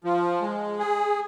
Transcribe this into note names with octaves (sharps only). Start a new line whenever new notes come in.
F3
G#3
G#4